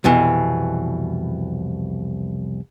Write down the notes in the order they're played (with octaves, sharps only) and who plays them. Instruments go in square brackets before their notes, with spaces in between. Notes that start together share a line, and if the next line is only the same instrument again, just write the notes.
[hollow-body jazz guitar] C2 F2 B2 E3